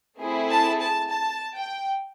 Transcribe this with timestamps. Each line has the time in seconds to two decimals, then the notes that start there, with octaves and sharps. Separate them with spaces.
0.21 A3 C4 E4 G#4
0.50 A5
0.81 A5
1.10 A5
1.55 G5